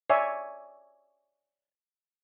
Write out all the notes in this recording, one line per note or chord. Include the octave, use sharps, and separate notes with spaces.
C#5 D5 E5 G#5